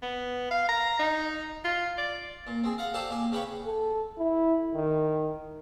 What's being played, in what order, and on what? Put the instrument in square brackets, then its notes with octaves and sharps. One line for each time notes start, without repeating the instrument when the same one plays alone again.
[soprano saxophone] B3
F5
A#5
D#4
F4
D5
[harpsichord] A#2
C4 G#4
F5 F#5 A#5
G4 A4 C5 D5 A5 D6
A#2 D5 G#5
C#3 B3 B4 C#5 G5 C#6
[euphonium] A4
E4
D#3